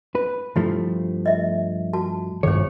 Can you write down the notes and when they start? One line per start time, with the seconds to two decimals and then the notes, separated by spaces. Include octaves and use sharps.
0.15 B4
0.56 G2 F3 A3 E4
1.26 D#5 E5
1.93 F#4 A5
2.43 G2 D#3 G#4 C5 C#5